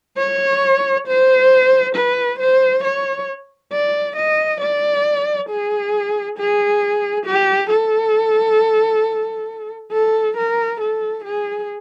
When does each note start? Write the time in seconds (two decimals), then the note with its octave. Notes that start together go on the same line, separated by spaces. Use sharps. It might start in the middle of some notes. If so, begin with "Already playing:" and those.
0.18 C#5
1.07 C5
1.96 B4
2.40 C5
2.84 C#5
3.72 D5
4.17 D#5
4.61 D5
5.49 G#4
6.39 G#4
7.27 G4
7.71 A4
9.92 A4
10.37 A#4
10.81 A4
11.25 G#4